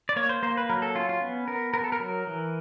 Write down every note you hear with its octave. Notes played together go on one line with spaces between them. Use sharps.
D5
A#3 C#5
C5
A#3 C5
B4
F#3 A#4
A4
C#4 F4
F4
B3
B3 A#4
B3 A#4
A4
A#4
F#3
E3